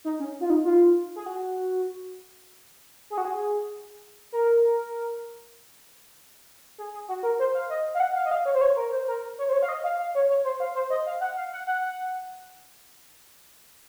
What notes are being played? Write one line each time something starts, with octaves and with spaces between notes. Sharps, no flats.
D#4
C#4
F4
D#4
F4
G#4
F#4
G#4
F#4
G#4
A#4
G#4
G#4
F#4
A#4
C5
F5
D#5
F5
F#5
F5
D#5
F5
C#5
C5
C#5
A#4
C5
A#4
C#5
C5
C#5
F5
D#5
F5
F5
C#5
C#5
C5
F5
C5
D#5
F5
F#5
F5
F#5
F#5